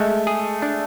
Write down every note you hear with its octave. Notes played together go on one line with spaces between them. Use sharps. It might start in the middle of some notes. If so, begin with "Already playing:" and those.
Already playing: G#3 A3
G#4
D4